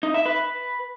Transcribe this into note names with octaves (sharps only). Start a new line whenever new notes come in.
D#4
E5
B4